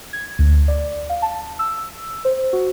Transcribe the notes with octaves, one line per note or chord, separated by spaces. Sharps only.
G#6
D2
D5
F5
A5
E6
C5
F#4